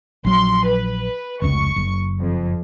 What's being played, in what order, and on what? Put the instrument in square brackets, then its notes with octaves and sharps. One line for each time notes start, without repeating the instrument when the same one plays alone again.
[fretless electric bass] A#1 F#3 [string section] C6
[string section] B4
[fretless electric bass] F1 C#2 [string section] C#6
[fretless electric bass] F#1
[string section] F2